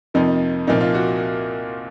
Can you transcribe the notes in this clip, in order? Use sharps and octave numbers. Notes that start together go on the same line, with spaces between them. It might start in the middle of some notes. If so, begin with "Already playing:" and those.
F2 C3 F3 A#3 D#4
C2 A#2 F3 A#3 D#4
F4
F#4